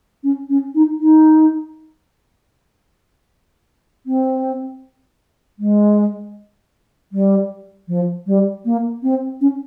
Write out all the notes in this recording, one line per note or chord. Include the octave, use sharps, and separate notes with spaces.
C#4
C#4
D#4
D#4
C4
G#3
G3
F3
G3
A#3
C4
C#4